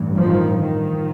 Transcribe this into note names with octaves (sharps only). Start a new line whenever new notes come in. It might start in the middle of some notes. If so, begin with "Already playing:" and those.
Already playing: A1 G2
D#3 F3
D#3 F3